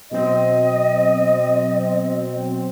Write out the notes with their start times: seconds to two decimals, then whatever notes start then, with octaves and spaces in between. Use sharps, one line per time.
0.11 B2 F#3 C4 D#5